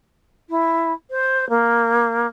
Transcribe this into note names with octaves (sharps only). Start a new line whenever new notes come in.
E4
C5
A#3